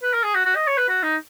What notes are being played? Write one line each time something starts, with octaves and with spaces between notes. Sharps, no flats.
B4
A#4
G#4
F#4
F#4
D#5
C#5
B4
F#4
D#4